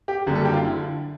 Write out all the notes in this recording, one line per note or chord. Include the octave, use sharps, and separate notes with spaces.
G4
F#1 F#2 D3 G3 G#4
A4
G4
F4
D3 E4